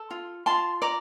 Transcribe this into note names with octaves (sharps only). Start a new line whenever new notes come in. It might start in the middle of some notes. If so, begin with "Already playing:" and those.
Already playing: A4
F4
F4 A5 C6
D5 A#5 D6